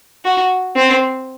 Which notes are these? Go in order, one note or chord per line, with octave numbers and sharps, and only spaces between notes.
F#4
C4